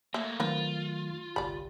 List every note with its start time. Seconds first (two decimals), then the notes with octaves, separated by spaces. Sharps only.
0.14 A3 A#3 E5
0.40 D#3 F#3 A3 C4 F4 A#4 B4
1.36 G1 C2 G4 D5 B5